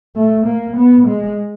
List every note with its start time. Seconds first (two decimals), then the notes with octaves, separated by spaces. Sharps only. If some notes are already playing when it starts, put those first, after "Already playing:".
0.16 A3
0.46 A#3
0.76 B3
1.07 G#3